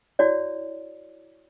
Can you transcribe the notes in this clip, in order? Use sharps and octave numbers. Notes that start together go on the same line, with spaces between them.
E4 F#4 C#5 D5